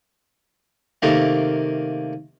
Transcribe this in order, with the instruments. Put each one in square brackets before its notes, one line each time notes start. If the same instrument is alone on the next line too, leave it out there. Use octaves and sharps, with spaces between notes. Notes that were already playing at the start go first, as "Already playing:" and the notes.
[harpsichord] C3 D#3 A3 A#3